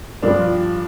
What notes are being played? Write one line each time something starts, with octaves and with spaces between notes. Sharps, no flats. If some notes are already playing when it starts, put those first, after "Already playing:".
G2 F3 D4